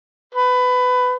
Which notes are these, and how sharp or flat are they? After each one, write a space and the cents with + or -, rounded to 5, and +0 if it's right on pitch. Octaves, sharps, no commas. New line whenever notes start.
B4 +20